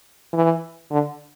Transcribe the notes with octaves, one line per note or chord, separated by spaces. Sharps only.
E3
D3